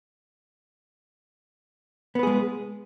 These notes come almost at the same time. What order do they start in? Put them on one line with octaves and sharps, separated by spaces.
B3 B4 G#4 G#3